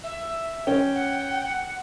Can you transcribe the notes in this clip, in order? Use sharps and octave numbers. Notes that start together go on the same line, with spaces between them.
E5
C#4 G5
F#5